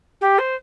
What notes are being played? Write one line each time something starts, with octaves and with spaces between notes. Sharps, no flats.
G4
C5